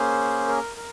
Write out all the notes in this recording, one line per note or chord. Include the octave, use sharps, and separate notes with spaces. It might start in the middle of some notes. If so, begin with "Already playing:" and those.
Already playing: A#3 C#4 G#4 C5
A#4
A#4